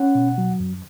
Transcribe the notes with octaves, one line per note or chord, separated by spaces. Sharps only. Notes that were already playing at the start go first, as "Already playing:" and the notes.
Already playing: C#4 F#5
B2
F#3
F#2